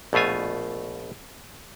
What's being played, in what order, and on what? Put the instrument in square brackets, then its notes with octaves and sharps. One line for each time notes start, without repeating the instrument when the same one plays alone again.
[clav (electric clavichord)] A#1 B2 A3 F4 G#5